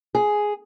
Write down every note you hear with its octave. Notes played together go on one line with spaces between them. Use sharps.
G#4